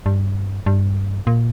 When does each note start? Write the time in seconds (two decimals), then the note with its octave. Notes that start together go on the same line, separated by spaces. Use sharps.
0.06 G2
0.66 G2
1.27 A#2